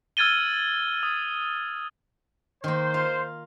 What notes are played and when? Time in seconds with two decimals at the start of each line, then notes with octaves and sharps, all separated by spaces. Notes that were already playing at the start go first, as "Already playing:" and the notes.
0.17 E6 F6 G#6 A6 D#7 G7
1.03 D#6
2.64 D#3 A#3 C5
2.94 F4